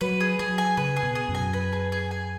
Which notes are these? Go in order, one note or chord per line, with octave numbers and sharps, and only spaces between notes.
F#3 B4
G#4
F#3 G#4
G#5
C#3 B4
G#4
B2
G#4
F#2
G#5
B4
G#4
G#4
G#5